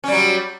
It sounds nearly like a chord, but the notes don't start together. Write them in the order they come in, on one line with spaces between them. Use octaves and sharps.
C#4 G3 F#3